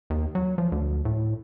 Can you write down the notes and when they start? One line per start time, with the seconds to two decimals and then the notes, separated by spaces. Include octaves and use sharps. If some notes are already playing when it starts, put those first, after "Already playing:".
0.10 D#2
0.35 F#3
0.58 F3
0.72 D2
1.05 A2